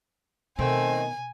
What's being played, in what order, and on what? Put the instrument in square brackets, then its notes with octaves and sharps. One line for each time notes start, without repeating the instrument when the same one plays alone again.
[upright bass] B2 [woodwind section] D#3 [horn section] A3 C4 [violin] G#5